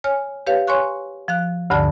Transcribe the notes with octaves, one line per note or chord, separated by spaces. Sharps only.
C#5 G#5 F6
G4 B4 C#5 F5
C#5 G#5 C6 C#6 F#6
F3 F5 F#6
D2 G2 D3 D5 A5